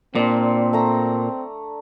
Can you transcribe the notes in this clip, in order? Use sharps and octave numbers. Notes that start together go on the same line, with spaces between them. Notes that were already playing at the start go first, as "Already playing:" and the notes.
A#2 C4 D4 D5
A3 A#5 E6